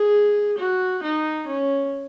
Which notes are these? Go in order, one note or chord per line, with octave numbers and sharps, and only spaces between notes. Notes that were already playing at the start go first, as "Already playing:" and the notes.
Already playing: G#4
F#4
D#4
C#4